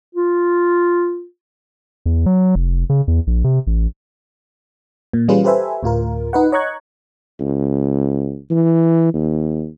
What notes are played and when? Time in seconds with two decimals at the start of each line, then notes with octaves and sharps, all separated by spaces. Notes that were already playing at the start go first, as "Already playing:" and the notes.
0.15 F4
2.06 E2
2.26 F#3
2.55 F1
2.90 C#3
3.08 E2
3.27 A#1
3.44 C3
3.67 A1
5.13 A#2
5.28 E3 G3 C#4 F4 G#4 B4
5.44 G4 A4 B4 C5 E5 G#5
5.83 D2 A2 F4 A#4
6.33 D#4 B4 F#5
6.52 C#5 D#5 A#5 C#6 F#6 G#6
7.40 C#2
8.51 E3
9.13 D#2